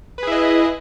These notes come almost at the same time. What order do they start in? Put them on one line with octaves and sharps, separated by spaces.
B4 G#4 E4 D#5